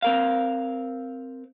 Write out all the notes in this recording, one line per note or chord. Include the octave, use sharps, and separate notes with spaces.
C4 A#4 F5